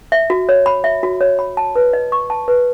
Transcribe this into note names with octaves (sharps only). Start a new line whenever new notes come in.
E5
F#4
C#5
B5
E5
F#4
C#5
B5
A5
B4
D#5
C#6
A5
B4